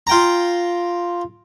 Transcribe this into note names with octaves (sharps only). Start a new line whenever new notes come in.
F4 G5 A#5